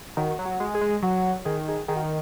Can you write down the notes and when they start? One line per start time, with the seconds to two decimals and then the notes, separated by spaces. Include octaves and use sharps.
0.17 D#3 F#4
0.39 F#3
0.46 F#4
0.60 G#3
0.75 G#4
0.81 G#3
1.02 F#3 F#4
1.45 D#3 G#4
1.69 G#4
1.88 D#3 G#4
1.96 F#4
2.04 D#4